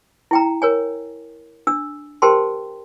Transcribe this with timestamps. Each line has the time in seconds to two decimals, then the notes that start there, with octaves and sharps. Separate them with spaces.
0.31 E4 G5 A#5
0.62 A#4 C#5 G#5
1.67 D4 E6
2.22 G4 A#4 C5 G5 A5 C6